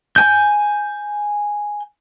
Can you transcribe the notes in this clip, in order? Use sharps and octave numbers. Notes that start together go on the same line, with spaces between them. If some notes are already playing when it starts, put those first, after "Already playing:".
G#5 G6